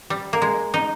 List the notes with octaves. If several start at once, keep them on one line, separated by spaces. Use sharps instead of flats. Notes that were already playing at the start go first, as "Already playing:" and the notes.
G3
A#3
G#3
D#4